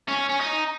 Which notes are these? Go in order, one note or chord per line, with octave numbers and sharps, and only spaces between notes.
C#4
C#4
D#4